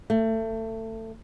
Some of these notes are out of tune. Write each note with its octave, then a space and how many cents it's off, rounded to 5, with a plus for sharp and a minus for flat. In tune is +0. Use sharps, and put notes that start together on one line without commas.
A3 +25